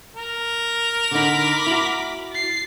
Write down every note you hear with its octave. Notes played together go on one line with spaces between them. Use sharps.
A#4
D3 D#4 B5 D6
E4 F#4
A6 C7